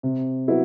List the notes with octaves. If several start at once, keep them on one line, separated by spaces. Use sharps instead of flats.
C3
F#3 B3 E4